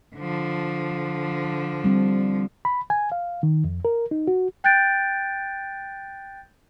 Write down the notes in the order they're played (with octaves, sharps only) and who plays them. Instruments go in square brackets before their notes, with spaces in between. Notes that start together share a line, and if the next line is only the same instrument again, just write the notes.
[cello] D3 F3
[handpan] G3 C4
[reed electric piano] B5
G#5
F5
D#3
F2
A#4
D#4
F#4
[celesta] G5 F#6 G6 A6 D7